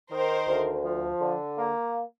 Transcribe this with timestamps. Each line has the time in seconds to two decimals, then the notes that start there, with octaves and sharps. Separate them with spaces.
0.11 D#3 A#4 C5
0.47 D2
0.84 F3
1.21 D3
1.58 A#3